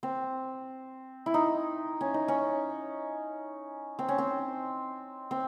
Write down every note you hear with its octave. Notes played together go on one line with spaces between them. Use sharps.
C4
E4
D#4
C#4
D#4
C#4
C4
C#4
C4
C4